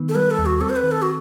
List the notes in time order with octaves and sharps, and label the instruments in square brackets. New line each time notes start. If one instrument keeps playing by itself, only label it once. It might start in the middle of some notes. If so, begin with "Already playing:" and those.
Already playing: [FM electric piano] D#3 B3
[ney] A4
[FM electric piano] G3 [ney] B4
[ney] A4
[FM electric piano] D#2
[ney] F#4
[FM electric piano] C4 [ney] A4
[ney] C5
B4
[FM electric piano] D#3
[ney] A4
F#4